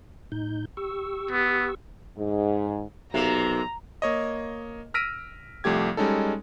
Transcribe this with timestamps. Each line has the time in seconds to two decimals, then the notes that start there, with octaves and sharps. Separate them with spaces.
0.32 A2 D#4 G6
0.77 G4 C#6 E6
1.31 B3
2.17 G#2
3.14 B1 C3 A#3 A#5
4.02 A#3 C#5 D#5
4.94 E6 F6 A#6 B6 D7 D#7
5.64 C2 F3 A3 G4 G#6
5.97 G3 G#3 C#4 D#4 A4